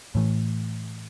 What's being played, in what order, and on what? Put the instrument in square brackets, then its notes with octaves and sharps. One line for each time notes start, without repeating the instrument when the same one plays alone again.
[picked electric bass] A2 E3 A3